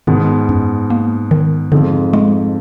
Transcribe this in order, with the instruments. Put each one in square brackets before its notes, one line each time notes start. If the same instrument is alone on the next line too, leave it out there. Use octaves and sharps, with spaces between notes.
[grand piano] G#2 B2 [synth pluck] D#3
[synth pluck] F#2
A#3
D#3
[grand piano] F2 G#2 [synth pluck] D3
[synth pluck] G#3